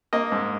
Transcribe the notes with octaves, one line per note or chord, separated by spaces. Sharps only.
A#3 D#5
G#2